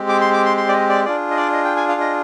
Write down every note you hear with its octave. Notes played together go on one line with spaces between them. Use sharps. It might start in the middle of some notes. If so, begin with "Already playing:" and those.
Already playing: G#3 C4 G4
D6
C6
D6
C6
C6
D5
D#5
D5
D4 F4 G#4 D5
D#5
D5
D#5
G5
G#5
F5
D#5